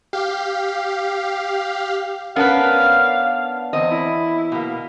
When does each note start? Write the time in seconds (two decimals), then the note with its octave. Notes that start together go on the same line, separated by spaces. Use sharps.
0.13 G4 F5
2.36 B3 C#4 D4 A#4 B4 F5
3.73 E2 C4 D#5
3.91 E4
4.52 B2 A#3